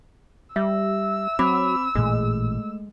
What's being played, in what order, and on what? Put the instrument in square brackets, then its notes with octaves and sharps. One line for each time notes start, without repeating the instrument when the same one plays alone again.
[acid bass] G3 [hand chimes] E5 [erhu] E6
[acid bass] F#3 [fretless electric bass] C4 [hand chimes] B5 D6
[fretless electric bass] A1 A#2 [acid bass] G#3 [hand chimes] A3